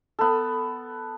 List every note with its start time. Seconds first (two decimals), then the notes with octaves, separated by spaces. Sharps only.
0.19 B3 A4